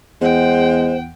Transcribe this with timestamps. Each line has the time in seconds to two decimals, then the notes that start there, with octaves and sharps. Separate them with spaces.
0.21 E2 G#3 C5 F#5 G5